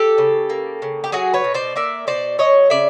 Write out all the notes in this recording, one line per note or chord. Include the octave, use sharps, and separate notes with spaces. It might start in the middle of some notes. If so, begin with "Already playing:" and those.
Already playing: G4 A4
C#3
A#3
C#3
G4
F#3 F#4 G#4
B4 C#5
B2
C5 D5
A#3 D5 E5
B2 C5 D5
F#3 C#5 D#5
C#3 D5 E5